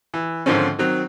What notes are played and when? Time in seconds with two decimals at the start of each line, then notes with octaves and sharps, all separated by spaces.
0.14 E3
0.46 G#2 D3 D#3 F3 C4 C#4
0.79 D#3 F#3 C4